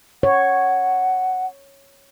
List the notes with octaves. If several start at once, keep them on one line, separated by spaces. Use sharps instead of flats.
C#5 F#5